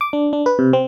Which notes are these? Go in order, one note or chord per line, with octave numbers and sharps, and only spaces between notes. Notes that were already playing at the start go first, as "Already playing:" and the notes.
D6
D4
D4
B4
C3
C4